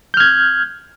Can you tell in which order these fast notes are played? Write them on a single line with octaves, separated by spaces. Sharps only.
G6 F6 G#6